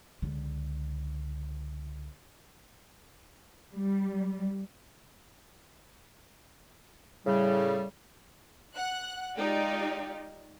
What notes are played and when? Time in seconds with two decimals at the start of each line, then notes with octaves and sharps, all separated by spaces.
0.22 C#2 D3
3.74 G3
7.26 A2 C#3 G3
8.76 F#5 F#6
9.36 G#3 D#4 F4 G4 D5